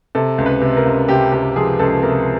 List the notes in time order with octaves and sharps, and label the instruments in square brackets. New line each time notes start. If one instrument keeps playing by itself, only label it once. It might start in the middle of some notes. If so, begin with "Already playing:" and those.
[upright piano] C3 A4
C#2
B4
C3
A#4
C#2
C3 G4
C#2 G4
F3 G#4
C#2 A4
C3 A#4